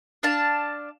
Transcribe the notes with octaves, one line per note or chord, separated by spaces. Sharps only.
D4 F5 A5